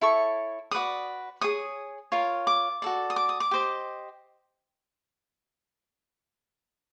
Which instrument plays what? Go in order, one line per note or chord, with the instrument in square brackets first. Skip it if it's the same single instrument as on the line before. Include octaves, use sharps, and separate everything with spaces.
[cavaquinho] E4 A4 C#5 C#6
F#4 B4 D5 D#6
G#4 C#5 D#6
F4 A#4 C#5
D6
F#4 A4 D5
D#6
D6
D#6
D6
G4 C5 D#5